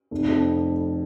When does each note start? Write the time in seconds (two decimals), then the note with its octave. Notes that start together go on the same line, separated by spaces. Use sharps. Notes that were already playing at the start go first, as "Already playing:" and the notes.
0.11 F1
0.28 F2